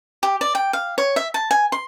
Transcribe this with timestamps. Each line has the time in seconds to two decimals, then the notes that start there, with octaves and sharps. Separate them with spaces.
0.23 G4
0.41 D5
0.55 G5
0.73 F5
0.98 C#5
1.16 E5
1.34 A5
1.51 G#5
1.72 C6